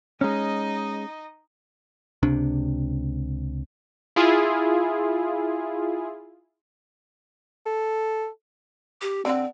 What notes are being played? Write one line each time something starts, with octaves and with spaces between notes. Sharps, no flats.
G#3 C#4 D#4 D#5
C#2 C3 D4
E4 F4 G#4
A4
G4
D3 C4 F#5